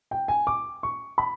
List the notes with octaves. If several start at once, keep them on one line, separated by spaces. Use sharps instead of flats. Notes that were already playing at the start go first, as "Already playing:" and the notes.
G5
G#5
D6
C#6
B5